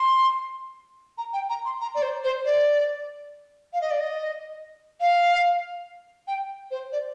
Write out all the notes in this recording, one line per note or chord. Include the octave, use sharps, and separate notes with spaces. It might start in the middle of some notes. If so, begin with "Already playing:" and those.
Already playing: C6
A#5
G5
A#5
C6
A#5
D5
C5
C5
D5
F5
D#5
D5
D#5
F5
G5
C5
D5